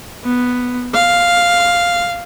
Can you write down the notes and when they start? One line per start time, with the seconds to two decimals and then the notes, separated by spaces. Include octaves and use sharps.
0.24 B3
0.94 F5